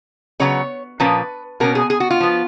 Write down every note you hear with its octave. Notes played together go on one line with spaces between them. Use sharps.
C#3 F#3 B3 C#5
A#2 F3 A#3 C#4 B4
B2 A#3 C#4 A#4
G#4
G#4
F#4
F4
F3 B3